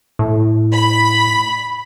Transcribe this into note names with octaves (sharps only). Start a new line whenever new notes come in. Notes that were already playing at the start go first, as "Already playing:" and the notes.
A2
B5